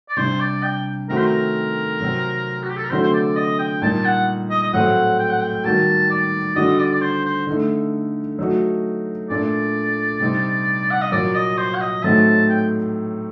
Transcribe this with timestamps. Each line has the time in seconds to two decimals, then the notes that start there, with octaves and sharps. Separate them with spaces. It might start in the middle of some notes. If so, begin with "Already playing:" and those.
0.09 D5
0.17 C3 G3 D4 C5
0.40 D5
0.63 G5
1.08 D#3 A3 C4 F#4 A#4
1.17 C5
1.25 A#4
2.00 C3 F#3 C4
2.63 F#4
2.69 G4
2.76 A4
2.84 A#4
2.90 D3 F#3 A3 C4 F#4 C5
3.03 C5
3.13 D5
3.36 D#5
3.59 G5
3.82 A#2 G3 A#3 D#4 A5
4.05 F#5
4.50 D#5
4.62 D#5
4.73 A2 F#3 A3 C4 F#5
5.19 G5
5.30 F#5
5.40 G5
5.64 D#3 G3 A#3 F#4 A5
6.10 D5
6.55 D3 G3 D4 F#4 D#5
6.79 D5
6.93 D5
7.01 C5
7.24 C5
7.47 D3 A3 D#4
8.39 F#3 A3 D#4 F#4
9.30 A#2 A3 D4 D5
10.20 C3 G3 C4 D#4
10.91 F#5
11.02 D#5
11.12 A#2 F#3 A#3 D5
11.35 D#5
11.58 C5
11.75 F#5
11.81 D#5
12.03 A2 F#3 A3 C4 D#4 A5
12.49 G5